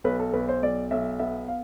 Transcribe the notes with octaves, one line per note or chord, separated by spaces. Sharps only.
B1 B4
A4
B1 B4
C5
B1 D5
B1 E5
B3 E5
F5